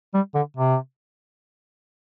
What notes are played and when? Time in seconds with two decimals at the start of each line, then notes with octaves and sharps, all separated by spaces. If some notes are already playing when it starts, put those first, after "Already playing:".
0.14 G3
0.35 D3
0.57 C3